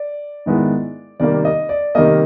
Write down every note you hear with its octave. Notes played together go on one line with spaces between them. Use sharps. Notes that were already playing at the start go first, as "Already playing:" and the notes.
Already playing: D5
G#2 D#3 G#3 B3 E4
C3 D#3 G3 A#3 D5
D#5
D5
C3 D#3 G3 A#3 D#5